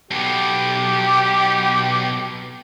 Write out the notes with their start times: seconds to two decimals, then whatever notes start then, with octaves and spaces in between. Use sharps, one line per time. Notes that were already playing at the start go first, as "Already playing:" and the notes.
0.11 B1 B2 G4